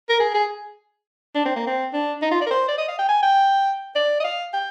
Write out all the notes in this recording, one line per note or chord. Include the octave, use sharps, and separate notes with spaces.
A#4
G#4
G#4
D4
C4
A#3
C4
D4
D#4
F4
D5
A#4
C5
D5
D#5
F5
G5
G#5
G5
D5
D#5
F5
G5